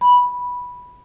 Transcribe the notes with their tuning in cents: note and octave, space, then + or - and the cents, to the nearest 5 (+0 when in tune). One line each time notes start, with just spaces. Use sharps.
B5 -10